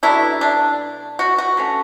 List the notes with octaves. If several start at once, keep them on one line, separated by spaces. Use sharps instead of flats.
B2 F#3 A3 D4 E4
D4
F#4
F#4
D3 A3 C#4